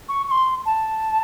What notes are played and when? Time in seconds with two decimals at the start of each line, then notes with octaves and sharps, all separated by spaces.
0.09 C#6
0.28 C#6
0.31 C6
0.66 A5